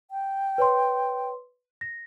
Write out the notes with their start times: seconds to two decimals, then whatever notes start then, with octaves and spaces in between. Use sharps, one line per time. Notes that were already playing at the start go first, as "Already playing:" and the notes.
0.11 G5
0.58 B4 C#5 C6
1.81 A#6